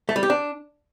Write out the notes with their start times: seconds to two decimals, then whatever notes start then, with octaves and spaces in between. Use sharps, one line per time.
0.09 A3
0.16 G3
0.23 G4
0.30 D4